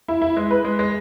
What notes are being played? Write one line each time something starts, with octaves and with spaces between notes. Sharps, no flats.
E4
E4
G#3
B4
G#3
G#3